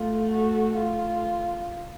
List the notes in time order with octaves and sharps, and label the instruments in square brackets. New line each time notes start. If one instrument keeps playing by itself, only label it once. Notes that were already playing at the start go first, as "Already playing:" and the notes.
Already playing: [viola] A3 [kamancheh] F4
[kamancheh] F#4
F4